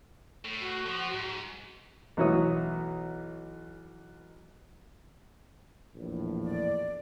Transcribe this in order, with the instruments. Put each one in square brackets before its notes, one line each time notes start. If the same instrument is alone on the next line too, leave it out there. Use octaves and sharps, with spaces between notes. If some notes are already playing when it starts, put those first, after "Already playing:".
[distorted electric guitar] A2
[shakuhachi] F#4
[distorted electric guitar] F3
G#2
[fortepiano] B1 E3 F#4 C#5 D#6
[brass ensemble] A#1 E2 A2
[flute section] D5